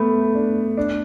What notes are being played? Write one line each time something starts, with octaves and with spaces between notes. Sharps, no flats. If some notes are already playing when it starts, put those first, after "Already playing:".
Already playing: A3 B3
D4
D4